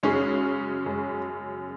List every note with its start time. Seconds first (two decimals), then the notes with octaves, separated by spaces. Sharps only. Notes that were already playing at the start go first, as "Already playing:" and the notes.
0.03 F#2 C#3 G#3 C#4
0.85 F#2 C#3 G#3